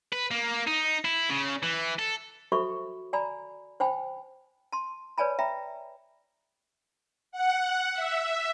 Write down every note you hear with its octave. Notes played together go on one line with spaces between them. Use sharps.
B4
A#3
D#4
E4
C#3
E3
A4
F#4 A4 C5 E5 B5 C#6
D5 G#5 A#5 B5
C5 G5 G#5 B5
A5 C6
B4 C#5 D5 G#5 A5 B5
E5 G5 A#5 B5
F#5
E5